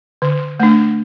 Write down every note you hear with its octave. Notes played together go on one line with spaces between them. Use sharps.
D3
A3 D4